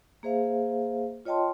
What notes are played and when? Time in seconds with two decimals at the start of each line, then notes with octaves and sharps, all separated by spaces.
0.23 A#3 G#4 C5 E5 F5
1.25 F4 C#5 D#5 G5 A5 C6